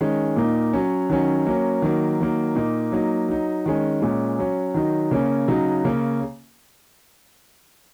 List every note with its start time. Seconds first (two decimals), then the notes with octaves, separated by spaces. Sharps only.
0.01 D#3 G#3 C#4
0.36 A#2 A#3 D#4
0.73 F#3 C#4
1.09 D#3 F#3 C#4
1.46 F#3 A#3 C#4
1.82 D#3 F#3 A#3
2.20 D#3 F#3 A#3
2.55 A#2 A#3 D#4
2.92 F#3 A#3 D#4
3.28 F#3 D#4
3.66 D#3 G#3 C#4
4.02 A#2 G#3 C#4
4.39 F#3 C#4
4.74 D#3 F#3 D#4
5.11 C#3 A#3 C#4
5.48 C#3 F#3 D#4
5.84 C#3 A#3 C#4